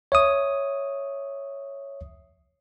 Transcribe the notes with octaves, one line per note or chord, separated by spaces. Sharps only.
C#5 E5 D#6